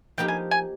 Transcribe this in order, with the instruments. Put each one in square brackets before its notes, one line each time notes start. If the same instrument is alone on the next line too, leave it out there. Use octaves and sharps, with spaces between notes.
[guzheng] F3 A#3 D#4 G4 [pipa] G5
[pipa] G#5
G#5